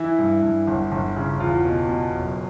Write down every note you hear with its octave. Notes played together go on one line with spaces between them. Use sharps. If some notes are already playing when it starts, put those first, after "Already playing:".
Already playing: E3 E4
G2
G2
G1
G1
C#3
E2 F4
B2
B2
F#1